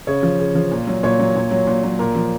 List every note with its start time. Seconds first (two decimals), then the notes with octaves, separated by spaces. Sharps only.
0.07 C#3 C#5
0.23 F3
0.39 C#3
0.55 F3
0.71 A#2
0.87 F#3
1.03 A#2 C#5
1.19 F#3
1.36 A#2
1.51 F#3
1.67 A#2
1.83 F#3
1.99 A#2 A#4
2.15 F3